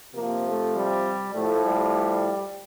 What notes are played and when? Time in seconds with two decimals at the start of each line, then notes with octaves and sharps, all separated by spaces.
0.15 C3 F3 A#3
0.46 A3
0.75 G3
1.34 A2 F3 A3
1.64 G3